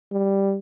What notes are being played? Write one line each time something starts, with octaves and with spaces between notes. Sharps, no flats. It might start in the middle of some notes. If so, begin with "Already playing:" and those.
G3